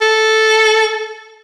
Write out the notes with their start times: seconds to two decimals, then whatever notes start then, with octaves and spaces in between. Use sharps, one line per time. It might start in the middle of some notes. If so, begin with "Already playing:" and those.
0.01 A4